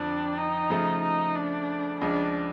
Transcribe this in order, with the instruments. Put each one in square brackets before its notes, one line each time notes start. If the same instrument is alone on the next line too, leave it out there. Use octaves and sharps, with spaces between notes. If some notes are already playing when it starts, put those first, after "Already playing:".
Already playing: [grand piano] F2 D3 F3 [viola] D4
[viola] D#4
[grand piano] C#3 F3 A3
[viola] D#4
D4
[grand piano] C#2 C#3 F3 [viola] D4